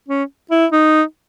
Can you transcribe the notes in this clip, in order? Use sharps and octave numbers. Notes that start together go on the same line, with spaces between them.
C#4
E4
D#4